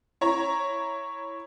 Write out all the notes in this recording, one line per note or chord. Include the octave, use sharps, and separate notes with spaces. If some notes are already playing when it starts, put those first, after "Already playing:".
E4 C#5 A#5